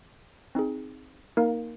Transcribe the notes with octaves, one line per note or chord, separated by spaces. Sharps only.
C4 D#4 G#4
A#3 D#4 A#4 F5